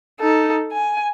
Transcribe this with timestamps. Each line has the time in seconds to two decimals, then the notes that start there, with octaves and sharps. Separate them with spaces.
0.20 D#4 A4
0.72 G#5